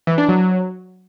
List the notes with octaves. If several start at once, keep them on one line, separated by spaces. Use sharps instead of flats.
E3
D4
F#3